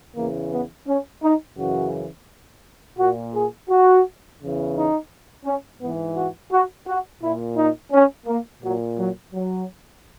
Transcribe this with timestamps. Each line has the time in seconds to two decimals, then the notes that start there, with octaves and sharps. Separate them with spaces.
0.15 E2 C#3 E3 A#3
0.51 B3
0.86 C#4
1.21 D#4
1.56 F#2 C#3 E3 F#4
2.97 A#2 F#4
3.33 G#4
3.68 F#4
4.39 E2 C#3 E3
4.75 D#4
5.44 C#4
5.79 G#2 E3 B3
6.16 F#4
6.50 F#4
6.86 F#4
7.20 A#2 E4
7.55 D#4
7.92 C#4
8.26 A#3
8.62 A#2 F#3
8.97 F#3
9.32 F#3